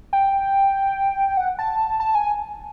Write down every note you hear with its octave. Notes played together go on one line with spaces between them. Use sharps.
G5
F#5
A5
A5
G#5